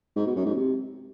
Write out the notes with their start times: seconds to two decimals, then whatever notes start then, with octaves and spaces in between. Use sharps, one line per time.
0.16 G#2
0.26 B2
0.36 F#2
0.46 G#2
0.56 C3